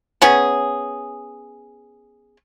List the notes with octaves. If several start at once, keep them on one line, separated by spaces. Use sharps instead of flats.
B3 C#4 G#4